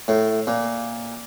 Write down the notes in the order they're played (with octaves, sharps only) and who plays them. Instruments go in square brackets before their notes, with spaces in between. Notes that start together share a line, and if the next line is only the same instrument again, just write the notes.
[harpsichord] A2
A#2